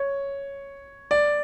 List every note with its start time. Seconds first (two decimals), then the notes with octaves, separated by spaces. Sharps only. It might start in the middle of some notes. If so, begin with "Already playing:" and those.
Already playing: C#5
1.11 D5